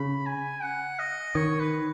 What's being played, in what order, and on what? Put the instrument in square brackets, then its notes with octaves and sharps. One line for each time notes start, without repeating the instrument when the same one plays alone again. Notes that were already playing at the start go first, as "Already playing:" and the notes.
Already playing: [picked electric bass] C#3 [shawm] B5
[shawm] G#5
F#5
D#5
[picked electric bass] D#3 [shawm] C#5
[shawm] B4